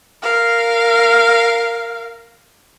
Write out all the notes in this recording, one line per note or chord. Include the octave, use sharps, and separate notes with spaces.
A#4 F5